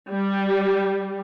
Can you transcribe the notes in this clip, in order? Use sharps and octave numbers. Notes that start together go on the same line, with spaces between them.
G3